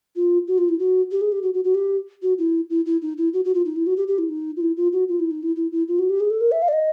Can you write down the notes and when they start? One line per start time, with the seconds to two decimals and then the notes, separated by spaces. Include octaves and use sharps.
0.16 F4
0.48 F#4
0.58 F4
0.69 E4
0.79 F#4
1.11 G4
1.21 G#4
1.32 G4
1.42 F#4
1.54 F#4
1.64 F#4
1.75 G4
2.22 F#4
2.38 E4
2.70 E4
2.86 E4
3.02 D#4
3.18 E4
3.33 F#4
3.45 F#4
3.54 F4
3.65 D#4
3.76 E4
3.86 F#4
3.97 G4
4.08 G4
4.18 E4
4.29 D#4
4.57 F4
4.61 E4
4.77 F4
4.93 F#4
5.09 F4
5.19 E4
5.31 D#4
5.43 E4
5.56 E4
5.72 E4
5.88 F4
5.99 F#4
6.09 G4
6.20 G#4
6.30 A4
6.41 A#4
6.52 E5
6.62 F5
6.68 D5
6.73 D#5